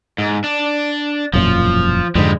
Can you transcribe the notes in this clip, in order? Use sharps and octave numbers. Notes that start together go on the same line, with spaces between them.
G#2
D4
E1 F#2 A#2 F3
F2 G#2 D3 G3 G#3